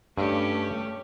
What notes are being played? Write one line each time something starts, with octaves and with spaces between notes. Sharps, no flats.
G2 A3 C#4 G4